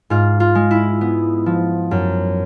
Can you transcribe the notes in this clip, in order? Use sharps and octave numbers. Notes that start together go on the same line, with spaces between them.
G#2 F4
F4
G#3
E4
B3
F3
F#2